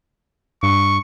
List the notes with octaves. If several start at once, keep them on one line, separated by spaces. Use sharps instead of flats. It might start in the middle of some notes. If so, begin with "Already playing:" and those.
G2 C#6